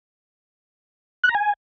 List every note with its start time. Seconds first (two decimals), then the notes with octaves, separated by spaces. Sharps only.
1.24 F#6
1.29 A#5
1.35 G#5